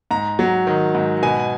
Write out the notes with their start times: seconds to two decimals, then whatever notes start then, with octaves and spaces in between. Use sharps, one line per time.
0.11 G#2 A#5
0.39 F#3
0.67 D#3
0.95 G#2
1.22 B2 G#5